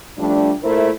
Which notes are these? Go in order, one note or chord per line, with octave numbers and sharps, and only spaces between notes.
F3 G3 A3 D4
A#2 A3 E4 A#4 C5